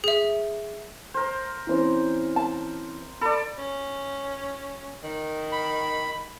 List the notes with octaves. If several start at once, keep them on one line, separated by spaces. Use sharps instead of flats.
G#4 E5
A#4 C5
E3 C4 C#4
A5
A4 D5 B5
C#4
D#3
B5